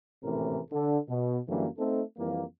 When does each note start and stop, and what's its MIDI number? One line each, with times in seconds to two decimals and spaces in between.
0.23 0.59 32
0.23 0.59 45
0.23 0.59 48
0.23 0.59 52
0.23 0.59 61
0.23 0.59 70
0.71 0.99 50
0.71 0.99 69
1.09 1.40 47
1.48 1.67 42
1.48 1.67 50
1.48 1.67 52
1.48 1.67 54
1.48 1.67 55
1.48 1.67 58
1.79 2.03 57
1.79 2.03 60
1.79 2.03 63
1.79 2.03 69
2.17 2.43 41
2.17 2.43 52
2.17 2.43 55
2.17 2.43 58